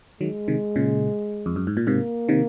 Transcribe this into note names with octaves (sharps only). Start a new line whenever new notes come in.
D#3 F#3 G#3
C3 D#3
A#2 C#3
F2
F#2
G#2
A#2
G#2 C3 A#3
C3 D#3